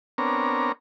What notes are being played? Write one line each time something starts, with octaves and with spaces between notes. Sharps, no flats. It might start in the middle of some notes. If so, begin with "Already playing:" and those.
B3 C4 D4 A#4 C#5 A#5